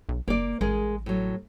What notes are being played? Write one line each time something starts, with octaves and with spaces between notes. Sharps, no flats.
B1
F#1 A#3 D5
A1 G#3 G#4 A#4
A2 F#3